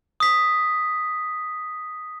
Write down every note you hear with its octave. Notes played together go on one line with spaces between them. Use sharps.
D#6 B6